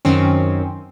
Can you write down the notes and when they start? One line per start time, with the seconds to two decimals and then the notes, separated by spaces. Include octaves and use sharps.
0.05 F#2 D#3 C4 C#4